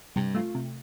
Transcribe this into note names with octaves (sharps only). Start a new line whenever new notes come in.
G2 C3 G3
A3 F4
C3